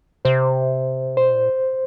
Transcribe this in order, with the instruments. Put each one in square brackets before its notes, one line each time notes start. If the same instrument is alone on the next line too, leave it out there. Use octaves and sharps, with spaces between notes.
[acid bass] C3 [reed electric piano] C5
[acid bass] B2 [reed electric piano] C5
[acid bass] A#2